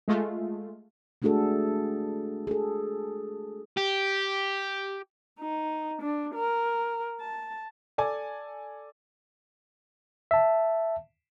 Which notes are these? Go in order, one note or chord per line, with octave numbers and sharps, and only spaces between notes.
G#3 A3 F4
G#3 A3 D4 F#4 G#4 A4
G#4 A4
G4
D#4
D4
A#4
A5
A4 D5 G#5
E5 A5